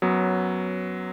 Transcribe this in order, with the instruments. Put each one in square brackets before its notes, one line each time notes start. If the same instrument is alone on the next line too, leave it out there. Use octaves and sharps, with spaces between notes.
[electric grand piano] F#2 F#3 B3